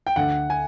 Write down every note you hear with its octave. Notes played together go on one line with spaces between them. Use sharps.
G5
D2 F#5
G#5